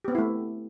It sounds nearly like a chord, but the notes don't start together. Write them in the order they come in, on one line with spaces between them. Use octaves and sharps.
G4 B3 C4 E4 A3